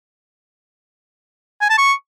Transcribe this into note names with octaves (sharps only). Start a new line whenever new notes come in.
G#5
A5
C#6